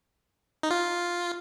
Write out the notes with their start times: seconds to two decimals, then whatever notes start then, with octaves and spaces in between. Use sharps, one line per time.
0.63 D#4
0.71 F4